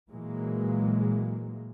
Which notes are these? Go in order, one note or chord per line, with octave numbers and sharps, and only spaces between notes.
A#2 E3 F#3 G#3 A#3